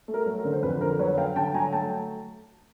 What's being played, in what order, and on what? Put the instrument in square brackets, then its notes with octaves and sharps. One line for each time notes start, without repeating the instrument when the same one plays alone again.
[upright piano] A3
A#4
F#3
A#4
D3
C5
F2 B4
D3 A#4 C5
F#3 B4 C#5
F#3 F5 G5
D3 G5 A5
F#3 G#5 A#5
A3 G5 A5